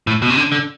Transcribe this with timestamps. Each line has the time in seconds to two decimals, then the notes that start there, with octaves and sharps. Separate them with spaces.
0.07 A2
0.22 B2
0.30 C3
0.37 D3
0.52 D3